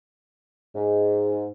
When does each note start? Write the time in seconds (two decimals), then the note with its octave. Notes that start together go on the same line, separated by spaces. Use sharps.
0.75 G#2